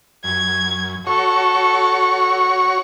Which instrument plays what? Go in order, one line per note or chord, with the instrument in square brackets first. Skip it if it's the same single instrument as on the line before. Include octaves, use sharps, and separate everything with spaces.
[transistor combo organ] F#2 [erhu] G#6
[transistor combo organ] F#4 C#5 C#6 [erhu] A4